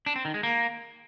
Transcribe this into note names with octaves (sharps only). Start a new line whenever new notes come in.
D4
C4
D#3
G#3
A#3